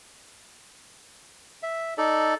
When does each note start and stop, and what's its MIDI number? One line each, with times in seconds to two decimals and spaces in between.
1.63 1.94 76
1.98 2.34 63
1.98 2.34 69
1.98 2.34 74